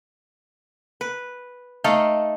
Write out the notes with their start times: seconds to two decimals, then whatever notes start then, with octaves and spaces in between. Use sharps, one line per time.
1.01 B4
1.84 A3 D#4 A4 F5